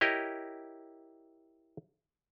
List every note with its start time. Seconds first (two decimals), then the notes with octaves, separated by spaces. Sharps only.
0.01 E4 G4 A#4 C#5 D#5